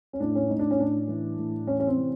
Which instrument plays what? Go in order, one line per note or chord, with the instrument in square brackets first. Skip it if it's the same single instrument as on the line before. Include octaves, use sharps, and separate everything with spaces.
[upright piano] C#4
A2 D4
C#4
A2 D#4
D4
C#4
A2 D4
E3
A2
E3 C#4
C#4
C4
C3